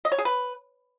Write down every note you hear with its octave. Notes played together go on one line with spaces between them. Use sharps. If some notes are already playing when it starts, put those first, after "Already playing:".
D#5
C#5
G#4
B4